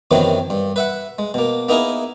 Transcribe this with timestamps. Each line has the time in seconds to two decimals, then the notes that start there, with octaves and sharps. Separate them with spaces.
0.11 F#2 C3 D#3 E3 F#3 B3
0.50 G2
0.76 B4 E5 F#5
1.19 G#3
1.34 B2 A#3
1.69 A#3 B3 D#4 E4 G#4 A#4